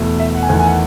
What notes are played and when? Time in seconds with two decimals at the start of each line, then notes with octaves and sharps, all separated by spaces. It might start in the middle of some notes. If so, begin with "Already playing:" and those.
Already playing: E2 B2 A3
0.20 E5
0.35 F#5
0.43 G#5
0.49 E2 D#3 A3 F#5
0.59 G#5
0.67 F#5